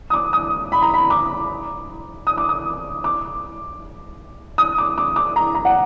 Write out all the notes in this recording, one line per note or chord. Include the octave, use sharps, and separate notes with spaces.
D#6
D6
D#6
B5
A#5
B5
D6
D#6
D6
D#6
D6
D#6
D6
D6
D6
A#5
A#5
F#5